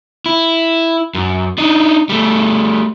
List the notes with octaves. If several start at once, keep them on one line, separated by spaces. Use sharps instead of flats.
E4
F#2
D4 D#4
G3 A3